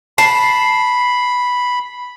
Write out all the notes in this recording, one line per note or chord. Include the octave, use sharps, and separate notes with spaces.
A5 B5 C7